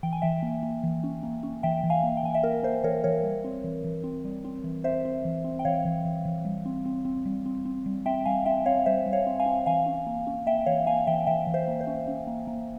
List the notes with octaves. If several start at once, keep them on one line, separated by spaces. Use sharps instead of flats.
E3 G5
G#5
E3 E5 G5
A#3
A#3
E3
C#4
A#3
C#4
E3 E5 G5
E3
F5 G#5
A#3
G5
E3 G#5
E5 G5
A#3 A#4
A#3 C5
E3 A#4 C#5
E3 A#4 C#5
G3
C4
E3
E3
C4
G3
C4
E3
C4 C5 E5
C4
E3
C4
G5
E3 C#5 F5
E3
E3
E3
G3
C4
C4
C4
G3
C4
C4
G3
C4 E5 G5
G3 F5 G#5
C4 E5 G5
C4 C#5 F5
G3 C5 E5
G3
C#5 F5
C4
F5 G#5
C4
E3 F5 G#5
C#4
A#3
C#4
A#3 E5 G5
E3 C#5 F5
A#3 F5 G#5
E3 E5 G5
E3 E5 G5
E3
C5 E5
A#3
C5
C#4
C#4
A#3
A#3